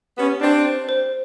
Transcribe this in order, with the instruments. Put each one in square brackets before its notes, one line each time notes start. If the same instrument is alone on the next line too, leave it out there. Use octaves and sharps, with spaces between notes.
[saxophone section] B3 C#4 [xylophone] G4
[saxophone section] C4 D4 [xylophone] C5
[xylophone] C5
C5